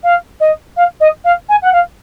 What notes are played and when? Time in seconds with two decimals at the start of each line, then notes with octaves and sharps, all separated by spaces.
0.03 F5
0.40 D#5
0.76 F5
1.00 D#5
1.24 F5
1.49 G#5
1.62 F#5
1.72 F5